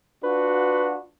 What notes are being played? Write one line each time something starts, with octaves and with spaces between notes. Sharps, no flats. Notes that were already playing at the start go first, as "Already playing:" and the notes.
D4 F4 F#4 B4